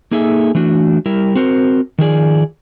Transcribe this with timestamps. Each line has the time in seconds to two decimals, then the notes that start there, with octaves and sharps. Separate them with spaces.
0.11 A#3 D#4 G#4 A4 E5
0.55 E3 A3 D4 F#4
1.06 G3 E4 A#4
1.35 C4 F#4 A#4 C5
1.98 D#3 F3 G#4 D5